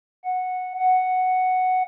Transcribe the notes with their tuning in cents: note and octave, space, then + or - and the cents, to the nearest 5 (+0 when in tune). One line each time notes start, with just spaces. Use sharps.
F#5 -10
F#5 +0